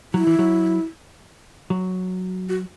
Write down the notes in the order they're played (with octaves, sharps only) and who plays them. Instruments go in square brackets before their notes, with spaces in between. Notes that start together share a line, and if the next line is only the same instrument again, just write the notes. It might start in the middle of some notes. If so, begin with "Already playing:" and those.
[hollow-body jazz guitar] F#3 [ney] E4
[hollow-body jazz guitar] E3
F#3
F#3
[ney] F#4